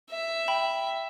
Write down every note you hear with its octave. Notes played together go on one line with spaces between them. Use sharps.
E5
G5 B5